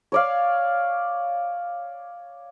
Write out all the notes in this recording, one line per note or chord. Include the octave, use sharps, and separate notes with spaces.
C#5 D5 F5